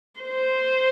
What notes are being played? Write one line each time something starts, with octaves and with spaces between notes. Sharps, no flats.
C5